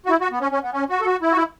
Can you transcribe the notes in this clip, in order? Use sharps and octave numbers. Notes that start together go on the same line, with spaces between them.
F#4
E4
F#4
B3
C#4
C#4
B3
C#4
F#4
A4
F#4
E4
F#4
E4